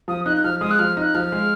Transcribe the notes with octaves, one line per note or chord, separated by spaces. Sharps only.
F3 D#6
D#4 F#6
F#6
F3 F6
G#3 D#6
F#6
F3 F6
D#4
F#6
F3 F6
G#3